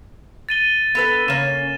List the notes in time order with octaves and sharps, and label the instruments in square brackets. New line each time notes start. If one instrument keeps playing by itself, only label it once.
[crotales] A6 D#7 G7
[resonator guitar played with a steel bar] B3 A4 B4
[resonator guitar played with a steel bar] C#3 A#3 [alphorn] C#4 [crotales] E7